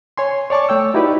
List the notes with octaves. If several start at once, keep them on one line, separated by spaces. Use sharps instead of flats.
C#5 G#5 C6
C#5 D5 A5 C#6 D6
A3 C#5 G5 E6
D#4 E4 F#4 G4 B4 D5